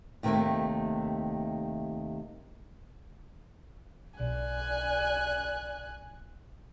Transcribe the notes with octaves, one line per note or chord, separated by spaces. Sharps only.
D#2 C3 D#3 F#3 A3 A#3
B1 D5 G#5 F#6